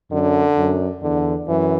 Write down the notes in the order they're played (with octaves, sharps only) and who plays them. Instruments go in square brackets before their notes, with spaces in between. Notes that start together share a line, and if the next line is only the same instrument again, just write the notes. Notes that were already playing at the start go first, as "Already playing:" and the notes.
[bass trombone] F#2 [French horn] D3
[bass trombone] F#2
[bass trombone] E2 [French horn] D3
[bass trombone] F#2 [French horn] E3